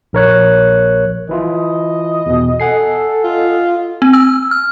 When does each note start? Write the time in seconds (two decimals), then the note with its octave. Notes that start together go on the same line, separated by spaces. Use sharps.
0.13 A#1 A#4 C#5 F#6
1.29 E3 E4 F4 D#5
2.26 E2 B2
2.60 A4 F#5 G#5 C7
3.24 F4 D#5
4.02 C4
4.13 E6
4.51 F6